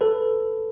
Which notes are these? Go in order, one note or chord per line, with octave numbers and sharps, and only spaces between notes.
A4 B4